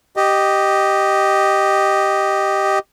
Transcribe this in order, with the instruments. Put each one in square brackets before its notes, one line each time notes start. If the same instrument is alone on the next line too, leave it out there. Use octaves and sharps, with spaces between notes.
[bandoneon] G4 D#5